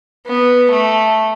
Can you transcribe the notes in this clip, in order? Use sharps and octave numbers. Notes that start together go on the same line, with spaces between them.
B3
A3